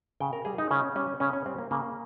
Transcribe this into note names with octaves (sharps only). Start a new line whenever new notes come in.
C#3 G5
A#4
G3 G#4
D#4
C#3 C#4
G3 C#4
C#3 C#4
C#4
G3 C4
A#3
C#3 A#3